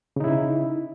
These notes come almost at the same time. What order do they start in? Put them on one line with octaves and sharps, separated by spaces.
C#3 D#4 E4